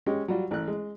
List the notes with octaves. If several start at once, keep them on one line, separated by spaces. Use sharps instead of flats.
G#3 C#4 G4
F#3 G3 F4
A1 F#6
G#3